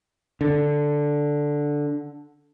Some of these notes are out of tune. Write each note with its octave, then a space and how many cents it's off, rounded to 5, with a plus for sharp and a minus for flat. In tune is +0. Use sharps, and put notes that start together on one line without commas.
D3 +0